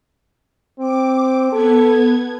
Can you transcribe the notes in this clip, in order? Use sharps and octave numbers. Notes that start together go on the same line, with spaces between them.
C4 D6
B3 A4 G#6